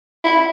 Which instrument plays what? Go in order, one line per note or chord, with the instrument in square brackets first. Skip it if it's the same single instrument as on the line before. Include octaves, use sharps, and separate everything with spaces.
[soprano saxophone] E4